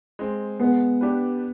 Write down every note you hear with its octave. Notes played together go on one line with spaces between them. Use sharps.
G#3 C4
G#3 B3
D4 G4 B4